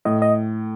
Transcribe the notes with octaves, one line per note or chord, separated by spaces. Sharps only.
A2 D#5
D#5